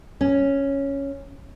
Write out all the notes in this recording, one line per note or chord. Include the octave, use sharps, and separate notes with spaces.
C#4